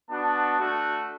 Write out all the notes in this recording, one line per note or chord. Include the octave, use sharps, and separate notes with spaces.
B3 D4 F#4 A5
A3 D4 F#4